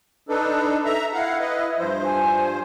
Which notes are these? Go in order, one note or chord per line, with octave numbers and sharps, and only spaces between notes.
D4 D#4 A4 B4
A4 E5 A#5
E4 F5 F#5
B4 D#5
G2 F3 C5
G#5